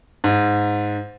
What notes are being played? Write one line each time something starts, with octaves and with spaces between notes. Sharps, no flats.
G#2